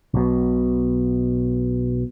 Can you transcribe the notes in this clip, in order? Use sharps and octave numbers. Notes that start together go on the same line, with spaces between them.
B1 B2